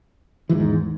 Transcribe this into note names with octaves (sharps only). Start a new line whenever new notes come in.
E2 G#2 D#3 E3